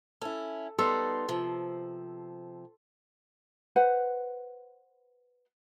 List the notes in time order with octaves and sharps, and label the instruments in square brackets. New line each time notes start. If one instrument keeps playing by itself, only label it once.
[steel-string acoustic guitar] C#4 E4 [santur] A4
[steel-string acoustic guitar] G3 B3 D#4 [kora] A4 [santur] C6
[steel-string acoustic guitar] C3 F3
[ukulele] B4 C5 F#5